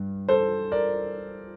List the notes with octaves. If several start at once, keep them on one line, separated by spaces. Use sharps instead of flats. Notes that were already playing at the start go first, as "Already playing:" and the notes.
Already playing: G2 G3
A4 C5
A#4 D5